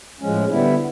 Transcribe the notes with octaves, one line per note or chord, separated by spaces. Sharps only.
A2 F3 G#3 C#4
D3 G3 B3 E4